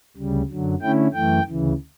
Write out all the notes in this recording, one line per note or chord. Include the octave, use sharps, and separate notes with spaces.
D2 C#3 G3
F#2 D3 F#3
D3 A3 C#4 E4 G5
F#2 E3 A3 G5
D2 C#3 E3